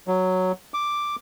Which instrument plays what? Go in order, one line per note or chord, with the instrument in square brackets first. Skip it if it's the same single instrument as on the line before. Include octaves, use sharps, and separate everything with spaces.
[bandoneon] F#3
D6